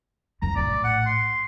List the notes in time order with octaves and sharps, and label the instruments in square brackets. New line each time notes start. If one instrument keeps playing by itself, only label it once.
[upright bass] C2 F2 [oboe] A#5
[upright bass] A#1 A2 [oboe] D5
[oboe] F#5
C6